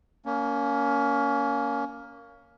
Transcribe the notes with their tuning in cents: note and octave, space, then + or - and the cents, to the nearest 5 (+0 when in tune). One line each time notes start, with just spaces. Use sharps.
A#3 +0 C#4 +25